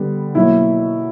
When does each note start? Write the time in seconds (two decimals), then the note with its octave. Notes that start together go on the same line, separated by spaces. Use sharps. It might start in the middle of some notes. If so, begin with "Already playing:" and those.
Already playing: D3 G3 B3
0.35 B2 F#3 A#3 E4